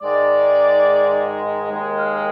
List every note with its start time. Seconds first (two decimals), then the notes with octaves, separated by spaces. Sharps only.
0.02 G#2 D#3 G#3 D5
1.69 D#2 D#3 G#3
1.97 F5